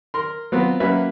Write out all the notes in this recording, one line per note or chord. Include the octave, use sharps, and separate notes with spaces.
A#4 C6
F#3 B3 C4 F4
F#3 A#3 C#4 B4 E5